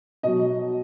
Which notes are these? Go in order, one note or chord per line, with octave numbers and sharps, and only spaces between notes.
B2 F#3 D#5